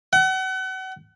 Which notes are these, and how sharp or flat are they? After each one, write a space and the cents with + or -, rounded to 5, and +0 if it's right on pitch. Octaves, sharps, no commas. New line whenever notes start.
F#5 +35